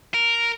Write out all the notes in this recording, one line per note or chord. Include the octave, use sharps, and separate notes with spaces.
A#4